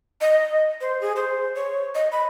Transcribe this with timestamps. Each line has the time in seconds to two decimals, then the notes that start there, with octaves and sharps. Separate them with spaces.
0.21 D#5
0.81 C5
1.01 G#4
1.16 C5
1.55 C#5
1.95 D#5
2.12 B5